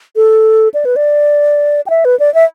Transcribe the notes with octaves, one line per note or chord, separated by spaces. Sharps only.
A4
D5
B4
D5
G5
E5
B4
D5
E5